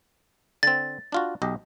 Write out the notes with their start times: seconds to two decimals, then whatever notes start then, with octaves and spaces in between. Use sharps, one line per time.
0.63 D3 C4 A6
1.12 D4 F4 F#4
1.42 B1 G4 D#5